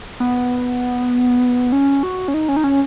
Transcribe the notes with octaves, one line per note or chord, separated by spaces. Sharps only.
B3
C#4
F#4
C#4
D#4
C#4
D#4
C#4